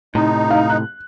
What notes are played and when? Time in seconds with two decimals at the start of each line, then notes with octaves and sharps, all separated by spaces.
0.15 A2 C3 D#4
0.51 F5
0.70 F#6